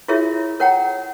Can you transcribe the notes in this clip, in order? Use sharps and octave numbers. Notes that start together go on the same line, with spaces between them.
E4 F4 G#4 A#4 C#5 E5
A#4 C#5 F#5 G5 A#5